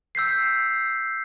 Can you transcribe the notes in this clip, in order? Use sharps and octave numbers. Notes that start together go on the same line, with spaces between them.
E6 G6 B6 C7